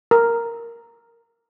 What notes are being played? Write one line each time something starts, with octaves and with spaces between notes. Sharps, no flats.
A#4